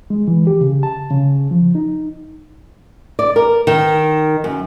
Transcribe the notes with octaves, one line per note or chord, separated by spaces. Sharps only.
G#3
E3
G4
C#3
A5
C#3
F3
D#4
D5
A#4
D#3
F#2